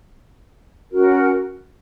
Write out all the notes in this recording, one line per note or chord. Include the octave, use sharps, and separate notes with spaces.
C#4 F#4 A#4